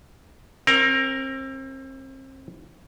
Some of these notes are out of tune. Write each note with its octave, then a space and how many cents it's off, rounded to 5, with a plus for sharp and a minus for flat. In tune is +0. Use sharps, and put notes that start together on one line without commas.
C4 +35 A#4 +0